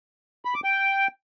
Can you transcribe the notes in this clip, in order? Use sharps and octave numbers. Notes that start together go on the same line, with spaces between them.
B5
D6
G5